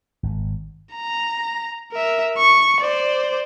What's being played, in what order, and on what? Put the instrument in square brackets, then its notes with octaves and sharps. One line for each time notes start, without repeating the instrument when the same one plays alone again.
[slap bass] G#1
[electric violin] A#5
A#4 E5
C#6
C5 D5